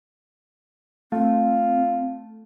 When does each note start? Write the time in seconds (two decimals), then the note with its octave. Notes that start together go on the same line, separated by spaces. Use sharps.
1.12 A3 C4 F4